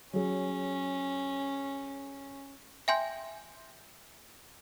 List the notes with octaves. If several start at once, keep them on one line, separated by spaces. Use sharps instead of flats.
F#3 C#4 G#4
E5 G5 G#5 C6 G6